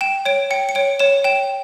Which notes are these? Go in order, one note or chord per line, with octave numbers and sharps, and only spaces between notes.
G5 E7
C#5 D7
G5 C#7
C#7
C#5 D7
C#5 E7
G5 E7